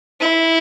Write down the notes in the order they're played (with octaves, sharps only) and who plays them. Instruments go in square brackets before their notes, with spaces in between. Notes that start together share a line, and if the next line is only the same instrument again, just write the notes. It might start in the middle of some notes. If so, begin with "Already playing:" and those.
[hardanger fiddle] E4